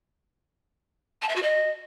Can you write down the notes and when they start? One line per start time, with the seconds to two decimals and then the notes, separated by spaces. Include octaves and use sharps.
1.22 A5
1.29 E5
1.35 F#4
1.42 D#5